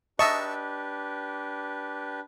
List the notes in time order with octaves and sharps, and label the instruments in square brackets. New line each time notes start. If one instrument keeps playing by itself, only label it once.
[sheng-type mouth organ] D4 G4 B4 [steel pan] D#5 [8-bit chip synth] E5 A5 C#6